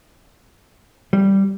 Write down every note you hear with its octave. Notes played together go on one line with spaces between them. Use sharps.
G3